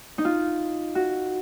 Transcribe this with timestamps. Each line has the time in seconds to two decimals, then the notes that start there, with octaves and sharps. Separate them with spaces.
0.18 D#4
0.25 F4
0.95 F#4